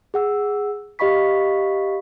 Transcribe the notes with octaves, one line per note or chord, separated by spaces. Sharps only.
G#4 F#5 E6
G4 D#5 F5 B5 C#6 B6